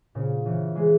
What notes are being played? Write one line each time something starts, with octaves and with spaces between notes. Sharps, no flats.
A#2 C#3
C#3 E3
E3 G#3